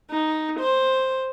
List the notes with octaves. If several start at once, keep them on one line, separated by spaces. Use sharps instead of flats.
D#4
C5